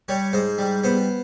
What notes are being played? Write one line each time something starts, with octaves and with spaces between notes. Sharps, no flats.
G3 C#5
G#2 C5
G3
B3 C5